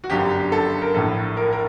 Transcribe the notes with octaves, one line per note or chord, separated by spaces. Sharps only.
F#4
G1 F#2 D3 G4
A4
A#4
A#1 A2 A4
A#4
A#4